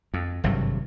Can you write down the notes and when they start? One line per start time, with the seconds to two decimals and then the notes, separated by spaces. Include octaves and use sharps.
0.14 F2
0.44 G#1 G2 C3 F#3